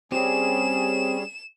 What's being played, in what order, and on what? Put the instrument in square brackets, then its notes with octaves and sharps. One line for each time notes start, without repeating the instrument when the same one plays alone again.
[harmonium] G3 C#4 G#4 [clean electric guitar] C4 G4 [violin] E7